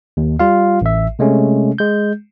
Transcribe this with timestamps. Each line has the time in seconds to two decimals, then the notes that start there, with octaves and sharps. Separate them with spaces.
0.17 D#2
0.39 G3 F4 F5
0.82 A1 E5
1.19 C3 G#3 A3 C#4
1.78 G#3 G6